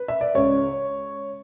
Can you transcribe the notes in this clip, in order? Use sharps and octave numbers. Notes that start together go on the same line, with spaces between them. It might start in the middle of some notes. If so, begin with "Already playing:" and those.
Already playing: B4
E5
D5
C#2 C#3 G#3 C#5